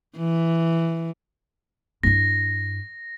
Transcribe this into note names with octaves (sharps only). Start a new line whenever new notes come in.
E3
G2 E4 A#6